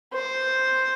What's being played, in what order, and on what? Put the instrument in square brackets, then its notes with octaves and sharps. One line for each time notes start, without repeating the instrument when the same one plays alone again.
[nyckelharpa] C5